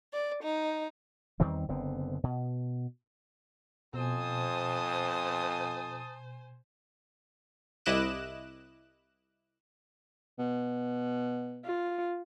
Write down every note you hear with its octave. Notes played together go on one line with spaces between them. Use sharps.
D5
D#4
E2 D#3 G3 C4
F#1 D3 B3 C4
B2
F2 B2 C5 G#5 A5 D#6
C2 E4 D#5 D6 F#6 E7
B2
F4